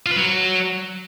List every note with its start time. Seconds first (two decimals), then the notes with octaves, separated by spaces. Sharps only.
0.06 F4
0.11 B4
0.16 F#3